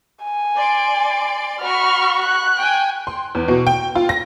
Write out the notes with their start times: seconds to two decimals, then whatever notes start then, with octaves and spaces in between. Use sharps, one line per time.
0.24 G#5
0.56 D5 C6 D7
1.62 F#4 B5 C#6 F6
2.19 F#6
2.58 G5 G#5
3.07 C6
3.35 E2
3.48 B2
3.67 G5
3.95 F4
4.09 A#6